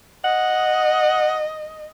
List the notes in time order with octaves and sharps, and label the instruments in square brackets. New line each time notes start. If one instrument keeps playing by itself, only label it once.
[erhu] D#5 [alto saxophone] F#5